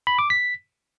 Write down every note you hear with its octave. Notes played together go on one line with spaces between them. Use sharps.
B5
D6
B6